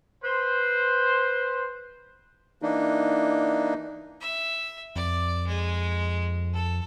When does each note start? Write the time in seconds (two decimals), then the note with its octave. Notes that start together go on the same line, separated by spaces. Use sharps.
0.24 B4 C5
2.62 E3 A#3 D4 D#4
4.21 E5
4.96 F2 D5
5.48 G#3
6.54 A4